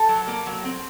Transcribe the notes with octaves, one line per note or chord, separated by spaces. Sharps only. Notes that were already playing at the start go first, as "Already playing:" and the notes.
Already playing: A4
F#3
A#3
F#3
C4